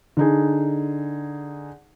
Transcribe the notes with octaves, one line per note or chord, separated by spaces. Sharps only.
D3 D#4 G#4